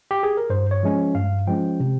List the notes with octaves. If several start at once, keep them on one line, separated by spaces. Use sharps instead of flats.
G4
G#4
A#4
G2 C5
C#5
F3 G#3 C#4
G2 F5
F3 G#3 C#4 G5
C3